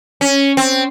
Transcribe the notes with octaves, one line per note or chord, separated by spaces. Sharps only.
C#4
C4